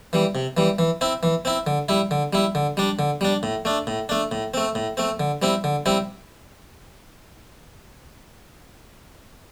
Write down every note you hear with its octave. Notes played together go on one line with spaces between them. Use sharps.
E3 G3
C3
E3 G3
E3
C4 E4
E3
C4 E4
D3
G3 E4
D3
G3 E4
D3
G3 D4
D3
G3 D4
A2
A3 D4
A2
A3 D4
A2
A3 C4
A2
A3 C4
D3
G3 C4 E4
D3
G3 C4 E4